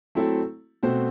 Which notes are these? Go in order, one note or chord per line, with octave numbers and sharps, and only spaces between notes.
F#3 A3 C4 E4 A4
B2 A3 C4 F#4 C5